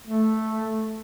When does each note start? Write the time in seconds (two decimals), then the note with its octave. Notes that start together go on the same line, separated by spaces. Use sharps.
0.07 A3